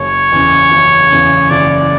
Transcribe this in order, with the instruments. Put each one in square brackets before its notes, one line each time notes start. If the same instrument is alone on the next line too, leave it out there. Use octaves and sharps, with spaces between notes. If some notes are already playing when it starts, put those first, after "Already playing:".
Already playing: [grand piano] F#1 [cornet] C#5
[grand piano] E2 C#3
F#1
E2 C#3
[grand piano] F#1 [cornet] D5